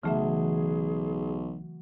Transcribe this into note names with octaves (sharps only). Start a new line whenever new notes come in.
B1 C#3 E3 F#3 A3 G#4 E5